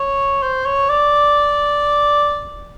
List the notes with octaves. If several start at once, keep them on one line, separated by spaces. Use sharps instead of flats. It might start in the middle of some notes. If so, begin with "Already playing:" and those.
Already playing: C#5
C5
C#5
D5